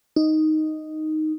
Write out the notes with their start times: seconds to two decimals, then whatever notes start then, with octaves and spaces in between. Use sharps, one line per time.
0.16 D#4